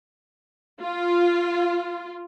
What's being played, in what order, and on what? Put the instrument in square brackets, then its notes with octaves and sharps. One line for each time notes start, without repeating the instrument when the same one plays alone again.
[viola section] F4